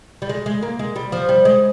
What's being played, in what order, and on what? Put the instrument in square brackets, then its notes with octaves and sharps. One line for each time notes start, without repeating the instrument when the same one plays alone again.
[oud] G3
G#3
G#3
A#3
G#3
G3
F3
G3
G#3